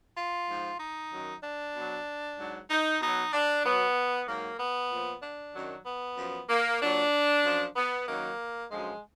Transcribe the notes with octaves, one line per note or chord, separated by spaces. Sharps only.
F4
G#2 F3
D#4
F#2 D#3 F#3
D4
B2 F#3
G#2 F#3
D#4
B2 F#3 D#4
D4
B2 F#3 B3
G#2 F#3 A#3
B3
A#2 F3
D4
F#2 D#3 F#3
B3
F#2 F3
A#3
A#2 F#3 D4
F#2 F3
B3
F#2 D#3 F#3 A#3
F#2 D3 F3 G#3